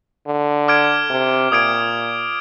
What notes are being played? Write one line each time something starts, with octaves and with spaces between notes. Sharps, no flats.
D3
D6 F6 G#6 D7
C3
A#2 D#6 G#6 D7